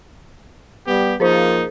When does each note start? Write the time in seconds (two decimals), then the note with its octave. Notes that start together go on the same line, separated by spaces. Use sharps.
0.87 G3 B3 G4
1.20 F3 A#3 D#4 G#4 A#4 C5